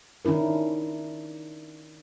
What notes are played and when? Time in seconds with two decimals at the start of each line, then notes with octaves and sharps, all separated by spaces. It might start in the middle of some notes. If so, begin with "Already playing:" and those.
0.25 D#3 C#4 D4 E4 A#4